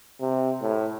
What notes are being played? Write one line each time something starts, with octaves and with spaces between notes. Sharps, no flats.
C3
A2